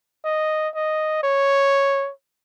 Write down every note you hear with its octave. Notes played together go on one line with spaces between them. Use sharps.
D#5
D#5
C#5